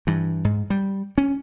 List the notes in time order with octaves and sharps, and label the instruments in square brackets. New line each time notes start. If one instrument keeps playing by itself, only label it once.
[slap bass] G2 E3
G#2
G3
C#4